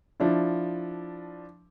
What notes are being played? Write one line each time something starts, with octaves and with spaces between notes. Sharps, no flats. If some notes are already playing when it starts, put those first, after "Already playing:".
F3 D4 E4